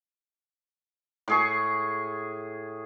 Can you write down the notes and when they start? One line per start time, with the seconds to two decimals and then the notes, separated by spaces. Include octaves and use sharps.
1.28 A2 G#4 C#6